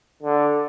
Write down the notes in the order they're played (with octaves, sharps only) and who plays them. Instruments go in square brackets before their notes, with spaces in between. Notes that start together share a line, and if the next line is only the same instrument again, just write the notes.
[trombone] D3